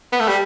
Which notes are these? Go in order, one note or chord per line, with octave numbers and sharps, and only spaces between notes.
B3
A3
G3